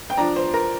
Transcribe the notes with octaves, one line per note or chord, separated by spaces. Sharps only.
G5
F3 D4 A#5
C5
A#4